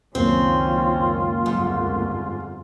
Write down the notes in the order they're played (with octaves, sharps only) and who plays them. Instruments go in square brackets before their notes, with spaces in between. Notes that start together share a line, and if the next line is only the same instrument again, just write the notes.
[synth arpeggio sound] C#2 F#2 A#3 [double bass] D#3 C#4 [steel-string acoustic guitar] C4 [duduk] F4
[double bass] G1 F2 [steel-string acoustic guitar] G#2